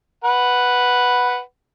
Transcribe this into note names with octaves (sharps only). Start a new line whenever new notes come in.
B4 F#5